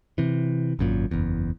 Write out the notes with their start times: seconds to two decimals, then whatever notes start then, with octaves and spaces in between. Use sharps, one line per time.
0.18 C3 E3
0.79 G#1 F#2 A#2
1.11 F#1 E2